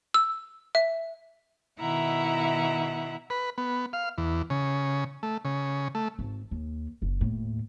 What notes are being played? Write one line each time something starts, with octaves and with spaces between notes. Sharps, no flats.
E6
E5
B2 D#3 E4 E5 F#5 A#5
B4
B3
F5
E2
C#3
A3
C#3
A3
G#1
D#2
F#1
D#2 A2